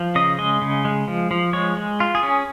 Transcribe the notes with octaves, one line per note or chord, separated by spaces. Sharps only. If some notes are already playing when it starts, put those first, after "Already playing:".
Already playing: F3
C#3 D#5
G#3 D#5
C#3
G#3
F3
F3
G#3 C#5
G#3
F4
G#4
C#4